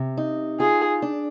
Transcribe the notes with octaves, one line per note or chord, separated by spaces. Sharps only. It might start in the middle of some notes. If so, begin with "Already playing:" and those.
Already playing: C3
D#4
F4 G#4
D4